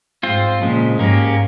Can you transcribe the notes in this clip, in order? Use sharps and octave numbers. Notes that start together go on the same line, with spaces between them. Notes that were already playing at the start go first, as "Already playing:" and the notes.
G#2 C4 F4 C5
A#2 C#3 F3 G#3
G#2 A#3 C#4 G4 A#4